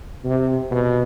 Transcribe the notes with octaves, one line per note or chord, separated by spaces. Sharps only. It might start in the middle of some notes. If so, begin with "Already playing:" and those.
C3
B2